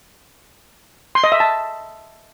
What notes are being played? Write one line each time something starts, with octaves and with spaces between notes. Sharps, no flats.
C6
D#5
E5
A5